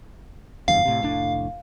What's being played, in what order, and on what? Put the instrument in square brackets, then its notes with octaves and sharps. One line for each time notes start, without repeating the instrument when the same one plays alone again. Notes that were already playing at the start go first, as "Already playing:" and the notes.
[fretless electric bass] F#1 E2 G2 [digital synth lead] F5
[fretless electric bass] A2 C3
F1 A2 D4